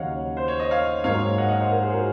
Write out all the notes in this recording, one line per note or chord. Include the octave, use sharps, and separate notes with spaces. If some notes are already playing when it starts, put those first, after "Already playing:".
Already playing: D#2 C#3 F#3 C#5 D#5 F5 F#5
C5
C#5
D#5
C#5 F5
G#2 F#3 A#3 C#5 F5
D#5 F#5
D#5 F#5
C5 D#5
A#4 C#5
G#4 C5
F#4 A#4